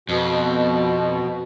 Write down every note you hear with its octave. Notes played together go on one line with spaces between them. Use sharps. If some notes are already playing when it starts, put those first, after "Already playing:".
F2 B2